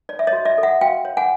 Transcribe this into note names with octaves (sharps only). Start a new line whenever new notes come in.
C#5 D5
E5
C#5 D#5
F#4
D5 E5
A4
E5 F#5
F#4 F5 G5
C#5
F#5 G#5